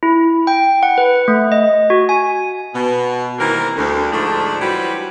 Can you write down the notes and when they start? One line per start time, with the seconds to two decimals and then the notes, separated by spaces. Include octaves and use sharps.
0.03 E4
0.47 G5
0.83 F#5
0.98 B4
1.28 A3
1.52 D#5
1.90 F#4
2.09 G#5
2.75 B2
3.39 D#3 E3 G3 A#3 C4 A#4
3.76 D2
4.12 D2 G#2 D3 F3 A3 D4
4.61 E3 F#3 G3 G4 B4 C5